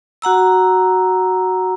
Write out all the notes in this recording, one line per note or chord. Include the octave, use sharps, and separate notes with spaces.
F#4 F#5 A#5 E6